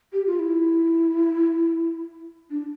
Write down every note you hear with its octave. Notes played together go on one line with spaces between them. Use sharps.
G4
F4
E4
D4